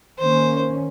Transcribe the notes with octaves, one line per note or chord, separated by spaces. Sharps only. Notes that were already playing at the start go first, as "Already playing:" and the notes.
D#3 A#3 C#4 C5